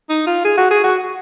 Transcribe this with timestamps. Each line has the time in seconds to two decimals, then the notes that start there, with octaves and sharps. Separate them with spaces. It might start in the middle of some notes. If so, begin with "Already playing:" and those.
0.09 D#4
0.27 F4
0.44 G#4
0.58 F#4
0.70 G#4
0.83 F#4